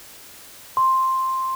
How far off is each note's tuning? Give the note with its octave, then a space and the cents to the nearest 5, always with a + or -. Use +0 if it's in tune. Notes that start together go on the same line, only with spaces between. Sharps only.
C6 +5